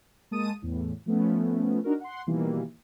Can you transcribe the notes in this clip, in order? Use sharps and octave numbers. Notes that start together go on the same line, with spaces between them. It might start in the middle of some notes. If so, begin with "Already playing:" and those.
G#3 A#3 A5 D#6 D#7
E2 A2
F3 A3 B3 C#4
D4 D#4 F#4 A#4
F#5 C6
B2 D#3 E3 G3 A#3